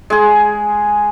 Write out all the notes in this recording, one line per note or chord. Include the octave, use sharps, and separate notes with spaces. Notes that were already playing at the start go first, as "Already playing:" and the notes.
G#3 G#4